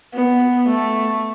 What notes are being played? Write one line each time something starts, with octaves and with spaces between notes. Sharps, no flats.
B3
A3